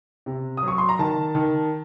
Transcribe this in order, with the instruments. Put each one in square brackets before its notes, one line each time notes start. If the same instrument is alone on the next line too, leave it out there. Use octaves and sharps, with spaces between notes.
[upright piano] C3
D#6
F#3 C#6
C6
A#5
D#3 A5
D#3